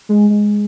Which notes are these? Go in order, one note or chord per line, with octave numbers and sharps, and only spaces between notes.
G#3
G#3